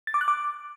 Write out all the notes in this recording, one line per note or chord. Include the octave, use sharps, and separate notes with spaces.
A6
D6
F#6
D6